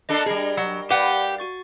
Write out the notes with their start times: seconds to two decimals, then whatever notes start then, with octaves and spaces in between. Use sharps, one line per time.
0.09 A#3 D4 A4 D#5 B5
0.26 G3 G#4 A#4
0.57 F#3
0.91 G4 B4 D5 F5 F#5
1.38 F#4 C#6 A6